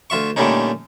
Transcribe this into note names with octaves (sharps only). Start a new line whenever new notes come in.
D2 F4 E5 C#6
A#2 D3 G3 A3 C#4 D#4